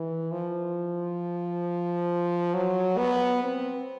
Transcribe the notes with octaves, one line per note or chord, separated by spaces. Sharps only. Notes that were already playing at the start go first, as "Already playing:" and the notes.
Already playing: E3
F3
F#3
B3
C4